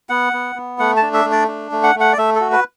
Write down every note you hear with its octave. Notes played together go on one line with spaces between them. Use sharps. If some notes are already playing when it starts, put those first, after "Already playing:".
B3 F#5
B3
B3
A3 F#5
A5
D4
E5
A3
D5
D4
A3
F#5
A3
F#5
D5
A3 E5
F#4 A4
B4